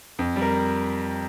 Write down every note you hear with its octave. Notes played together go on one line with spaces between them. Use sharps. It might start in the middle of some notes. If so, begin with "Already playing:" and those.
F2
G3
A#4